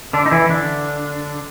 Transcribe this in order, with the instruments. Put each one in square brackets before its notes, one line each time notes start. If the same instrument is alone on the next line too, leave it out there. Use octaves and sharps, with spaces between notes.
[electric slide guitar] D3 D4
D#4
E3 E4
D3 D4